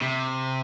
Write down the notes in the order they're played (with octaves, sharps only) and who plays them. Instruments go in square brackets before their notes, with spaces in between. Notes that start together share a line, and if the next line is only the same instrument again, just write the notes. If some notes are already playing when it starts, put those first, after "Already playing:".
[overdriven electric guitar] C3